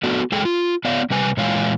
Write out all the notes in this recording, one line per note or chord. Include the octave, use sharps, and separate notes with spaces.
A3 B3 D4 F#4 A4
G#3 G#4 A4 G5
F4
B3 C#5 D5 F5
C3 G3 B4 G#5
A#2 E3 G#3 C#5 F5 G#5